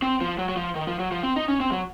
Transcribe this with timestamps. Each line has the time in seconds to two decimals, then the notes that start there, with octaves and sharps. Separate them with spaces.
0.02 C4
0.21 F3
0.38 F#3
0.49 F#3
0.56 F3
0.75 D#3
0.87 F3
0.99 F#3
1.12 F3
1.23 C4
1.36 D#4
1.48 C#4
1.60 C4
1.72 F#3